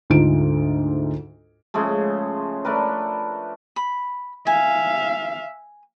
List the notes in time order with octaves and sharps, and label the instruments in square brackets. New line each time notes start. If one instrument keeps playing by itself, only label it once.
[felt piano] D2 G#2 D3 D#4 F4 D7
[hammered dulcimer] C#3 F3 G#3 A3
A3 D4 A#4 B4
[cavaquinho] B5
[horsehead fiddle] E5 F5 [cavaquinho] G#5